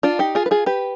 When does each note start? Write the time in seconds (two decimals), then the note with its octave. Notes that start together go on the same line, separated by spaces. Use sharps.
0.03 D4 F4
0.19 D#4 G4
0.35 F4 G#4
0.46 B4
0.51 F4 G#4
0.66 G4 B4